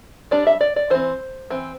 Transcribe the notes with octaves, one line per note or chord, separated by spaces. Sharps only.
G3 D4 D5
E5
D5
D5
E3 C4 C5
E3 C4